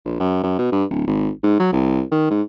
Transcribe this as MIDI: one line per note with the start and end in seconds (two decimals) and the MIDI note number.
0.05 0.17 34
0.20 0.42 42
0.43 0.58 42
0.59 0.67 47
0.72 0.85 43
0.90 1.05 26
1.07 1.30 32
1.43 1.58 44
1.60 1.72 54
1.72 2.02 36
2.12 2.28 51
2.31 2.42 44